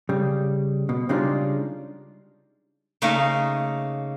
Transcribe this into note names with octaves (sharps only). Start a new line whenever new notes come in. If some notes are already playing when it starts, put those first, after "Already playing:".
C#3 G3
B2
C#3 G3 G#3 D4 D#4 F4
C#3 A3 A#3 D#4 D#5